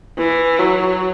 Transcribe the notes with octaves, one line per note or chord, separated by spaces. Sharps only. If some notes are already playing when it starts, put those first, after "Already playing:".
E3
F#3